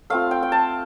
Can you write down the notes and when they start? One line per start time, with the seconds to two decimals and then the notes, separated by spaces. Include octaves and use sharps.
0.10 A3 C4 F4 F5
0.31 G5
0.43 G5
0.52 A5